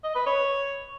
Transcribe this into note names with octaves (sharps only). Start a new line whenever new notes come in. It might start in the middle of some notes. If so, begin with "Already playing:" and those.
D#5
B4
C#5